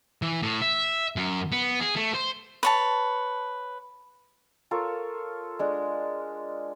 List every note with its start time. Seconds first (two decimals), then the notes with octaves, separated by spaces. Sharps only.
0.22 E3
0.42 A2
0.62 E5
1.16 F#2
1.52 B3
1.80 G#4
1.96 A3
2.14 C5
2.63 B4 C#5 A5
4.71 F4 A4 A#4 C#5
5.59 G#3 D4